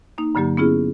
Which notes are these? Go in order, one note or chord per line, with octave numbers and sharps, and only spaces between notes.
A#3 D#4
G2 D3 F#3 A#3 G4
B3 C#4 E4 F4 G#4